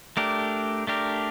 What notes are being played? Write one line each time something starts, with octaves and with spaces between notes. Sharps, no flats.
A3 D4 G4 A#4
A3 D4 G4 A#4